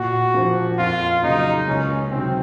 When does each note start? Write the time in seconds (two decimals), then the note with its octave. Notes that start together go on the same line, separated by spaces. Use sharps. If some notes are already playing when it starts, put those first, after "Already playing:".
Already playing: A#2 F#4
0.34 F3 A#3
0.78 F2 F4
1.23 C#3 F#3 A#3 D#4
1.68 C#2 C#4
2.11 C3 D#3 F#3 C4